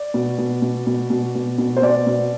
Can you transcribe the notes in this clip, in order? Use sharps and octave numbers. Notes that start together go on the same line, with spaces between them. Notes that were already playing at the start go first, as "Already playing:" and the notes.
Already playing: D5
B2
B2
B2
B2
B2
B2
B2
C5
B2 D5
B2